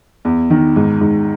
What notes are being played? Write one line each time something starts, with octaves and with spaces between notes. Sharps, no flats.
E2
D#3
G#2
G#2